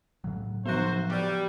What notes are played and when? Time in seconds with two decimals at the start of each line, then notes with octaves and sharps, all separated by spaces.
0.24 A2 C#3 F#3
0.66 F3 B3 F#4 C5
1.10 G3